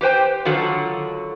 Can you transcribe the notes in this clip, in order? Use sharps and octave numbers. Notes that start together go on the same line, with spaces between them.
G4 B4 C5 G5
D3 D#3 F#3 F4 F#4 A4